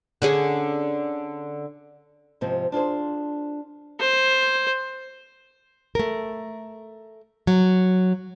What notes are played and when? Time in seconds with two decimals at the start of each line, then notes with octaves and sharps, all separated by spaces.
0.22 D3 C#4 G#4
2.41 G#2 C3 F3 C4
2.72 D4 F4 G#4 C5
4.00 C5
5.95 A3 A#4
7.47 F#3